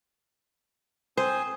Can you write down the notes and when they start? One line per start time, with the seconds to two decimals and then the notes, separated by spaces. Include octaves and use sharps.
1.17 C4 C5 G#5 D#6